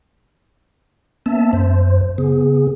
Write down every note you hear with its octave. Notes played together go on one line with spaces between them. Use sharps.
A#3 B3 C#4 E5 A5
F#2 C5
C#3 B3 G#4